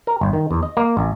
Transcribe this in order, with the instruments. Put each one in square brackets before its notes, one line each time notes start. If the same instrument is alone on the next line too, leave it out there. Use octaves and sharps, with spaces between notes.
[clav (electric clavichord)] A#4
G1
D#3
E2
D#5
A#3
A1